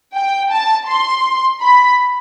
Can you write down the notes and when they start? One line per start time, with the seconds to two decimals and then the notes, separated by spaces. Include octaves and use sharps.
0.15 G5
0.51 A5
0.88 C6
1.62 B5